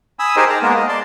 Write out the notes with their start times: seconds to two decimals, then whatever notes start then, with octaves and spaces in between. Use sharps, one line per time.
0.19 G#5 B5 D#6 E6
0.36 D#4 G4 G#4 A#4 C5 D#5
0.49 A5 A#5
0.62 G#3 A#3 B3 A#4
0.76 D#5
0.89 D5 A5 C6